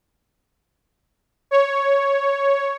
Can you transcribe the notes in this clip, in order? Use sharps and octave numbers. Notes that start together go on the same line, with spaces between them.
C#5